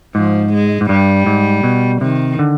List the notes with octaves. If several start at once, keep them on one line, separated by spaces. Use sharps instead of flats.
G#2 F3
G#3
G#2
G2 G3
G#2
B2
C3 D#3
D3